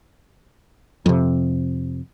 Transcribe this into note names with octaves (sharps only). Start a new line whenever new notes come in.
F2 C3